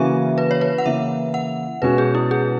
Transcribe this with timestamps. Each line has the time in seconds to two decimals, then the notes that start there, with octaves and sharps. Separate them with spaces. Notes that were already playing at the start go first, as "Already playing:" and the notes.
Already playing: C#3 E3 A#3 C#4 F#4 E5
0.38 B4
0.51 C#5
0.61 B4
0.78 F#5
0.85 C#3 E3 A#3 E5
1.34 F#5
1.82 B2 G#3 C#4 F#4 B4
1.98 G#4
2.15 E4
2.31 G#4